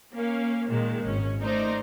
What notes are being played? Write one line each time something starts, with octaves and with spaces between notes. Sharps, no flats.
A#3 C#4 F5
A#2 D#3 G#3 A#3
G#1 C#4
A3 D#4 A#4 C5 D5